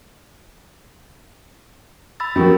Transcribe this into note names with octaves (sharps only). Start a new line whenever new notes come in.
B5 E6 A6
F3 C4 C#4 F#4 G4 A#4